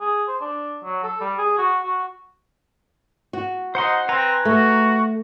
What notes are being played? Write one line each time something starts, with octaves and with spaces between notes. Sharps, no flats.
G#4
C5
D4
F#3
A4
G3
G#4
F#4
F#4
F#4
D#4 C5 F#5 C6
C4 B4 G#5 A#5
A3 F#4